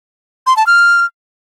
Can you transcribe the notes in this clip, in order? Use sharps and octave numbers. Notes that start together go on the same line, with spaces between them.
C6
A5
F6